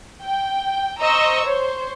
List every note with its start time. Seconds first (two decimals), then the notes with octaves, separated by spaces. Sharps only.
0.22 G5
1.00 C5 D#5 A#5 C#6 E6
1.45 C5 C#5